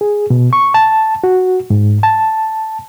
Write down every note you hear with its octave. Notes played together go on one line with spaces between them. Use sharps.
G#4
B2
C#6
A5
F#4
G#2
A5